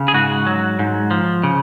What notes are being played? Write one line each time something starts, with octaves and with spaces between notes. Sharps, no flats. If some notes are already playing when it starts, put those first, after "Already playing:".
Already playing: C#3
G#4
G#2 F#4
F#3
G#2
F3
C#3